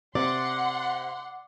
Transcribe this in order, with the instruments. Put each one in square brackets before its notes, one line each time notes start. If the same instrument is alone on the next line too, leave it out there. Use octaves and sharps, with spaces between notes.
[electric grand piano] C3 [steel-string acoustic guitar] D5 [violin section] F#5 C6